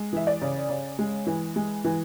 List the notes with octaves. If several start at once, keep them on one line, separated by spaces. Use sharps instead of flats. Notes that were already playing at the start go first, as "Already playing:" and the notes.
Already playing: G#3
E3 E5
D5
C#3
C#3
G#3
E3
G#3
E3